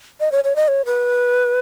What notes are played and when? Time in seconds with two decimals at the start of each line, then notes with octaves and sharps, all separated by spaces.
0.20 D#5
0.32 C#5
0.44 C#5
0.56 D#5
0.68 C#5
0.86 B4